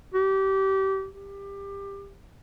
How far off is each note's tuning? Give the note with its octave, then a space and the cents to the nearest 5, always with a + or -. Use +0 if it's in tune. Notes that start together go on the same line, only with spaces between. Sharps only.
G4 -25
G4 +20